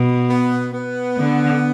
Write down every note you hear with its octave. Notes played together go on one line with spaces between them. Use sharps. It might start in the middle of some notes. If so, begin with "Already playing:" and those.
Already playing: B2
B3
B3
D3